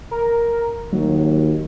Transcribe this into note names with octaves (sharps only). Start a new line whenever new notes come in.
A#4
D#2 F#3